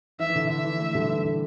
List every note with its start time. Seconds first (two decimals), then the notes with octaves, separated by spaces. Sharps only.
0.19 E3 E5
0.29 E3
0.35 D3
0.49 D3 E5
0.64 E3
0.80 E3 A3
0.95 D3 G3
1.10 E3
1.25 D3